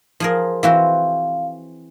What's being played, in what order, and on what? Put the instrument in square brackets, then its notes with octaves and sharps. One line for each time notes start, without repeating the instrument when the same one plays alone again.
[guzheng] F3 G#4 A#4
[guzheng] E3 C4 F#4 [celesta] F5